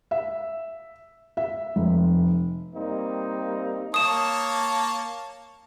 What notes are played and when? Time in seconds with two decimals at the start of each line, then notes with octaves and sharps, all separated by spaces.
0.11 E5
1.37 E5
1.76 F1
2.74 G3 A#3 C4 D#4
3.94 A#3 C#5 A5 D#6 E7